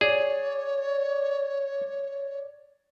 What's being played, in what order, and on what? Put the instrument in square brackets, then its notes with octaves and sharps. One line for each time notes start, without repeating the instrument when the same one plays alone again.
[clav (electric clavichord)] G#4 [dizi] C#5 [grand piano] D5